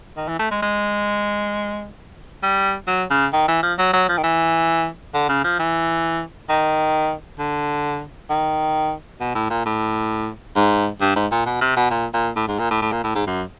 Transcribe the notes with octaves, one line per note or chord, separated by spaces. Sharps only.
D#3
E3
A3
G#3
G#3
G3
F#3
C#3
D#3
E3
F3
F#3
F#3
F3
D#3
E3
D3
C#3
F3
E3
D#3
D3
D#3
B2
A2
A#2
A2
G#2
G2
G#2
A#2
B2
C3
B2
A#2
A#2
A2
G#2
A#2
A2
A2
A#2
A2
G#2
F#2